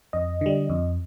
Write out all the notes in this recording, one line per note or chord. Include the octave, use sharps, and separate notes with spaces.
F2 D#5
D3 G3
F2